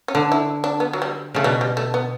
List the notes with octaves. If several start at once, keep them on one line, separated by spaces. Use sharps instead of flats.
C#4
D3 D4
E4
D4
B3
F#3
G3
C#3 A3
B2 G3
G3
A3
B3